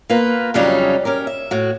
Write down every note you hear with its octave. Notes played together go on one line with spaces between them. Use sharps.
A#3 B3 F4 B4
F2 C#3 F#3 G3 C#4 D#4
C#4 G4 A#4
E5
A2 F#4